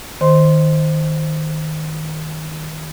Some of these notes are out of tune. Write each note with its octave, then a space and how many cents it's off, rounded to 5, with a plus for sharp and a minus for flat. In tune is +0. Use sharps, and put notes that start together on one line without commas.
D#3 +0 C5 +0 C6 +0